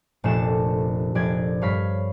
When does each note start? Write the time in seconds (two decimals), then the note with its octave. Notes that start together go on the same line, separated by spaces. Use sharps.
0.24 F1 A#2 A3 D4 A5 E7
1.15 F1 D5 G#6
1.62 G2 C#5 F5 B5 B6